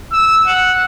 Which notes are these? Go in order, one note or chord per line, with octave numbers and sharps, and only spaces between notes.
E6
F#5